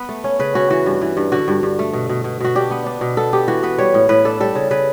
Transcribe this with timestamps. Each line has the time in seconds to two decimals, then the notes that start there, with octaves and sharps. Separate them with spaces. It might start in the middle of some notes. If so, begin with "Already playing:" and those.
Already playing: B3 B4
0.09 A3
0.24 C#4
0.39 C#3 B4
0.55 C#4 F#4
0.70 E3 F#4
0.86 G2
1.01 E3
1.17 G2
1.32 D3 F#4
1.48 G2
1.63 G2
1.79 A3
1.93 B2
2.09 B2
2.24 B2
2.40 B2 F#4
2.55 D4 G4
2.71 B3
2.86 D4
3.01 B2
3.17 B3 A4
3.33 B3 G4
3.48 E3 F#4
3.63 B3 B4
3.78 G3 C#5
3.94 A2
4.09 A2 B4
4.25 D4 A4
4.40 G3 A4
4.55 C#3
4.71 C#3 B4